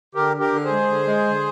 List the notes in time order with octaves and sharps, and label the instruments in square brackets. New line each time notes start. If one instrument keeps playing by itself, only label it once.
[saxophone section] D3 [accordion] G4 A#4
[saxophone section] D4
[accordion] G4 A#4
[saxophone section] D3
[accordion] G#4 C5
[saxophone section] G#3
D3
G#3
D3